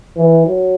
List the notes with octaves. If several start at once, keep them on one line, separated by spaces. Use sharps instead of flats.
E3
F#3